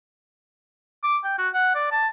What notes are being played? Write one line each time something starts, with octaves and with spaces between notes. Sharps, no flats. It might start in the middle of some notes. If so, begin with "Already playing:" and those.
D6
G5
F#4
F#5
D5
A5